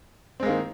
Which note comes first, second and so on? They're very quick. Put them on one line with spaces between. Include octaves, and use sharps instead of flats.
C4 G#3 A#3 D#3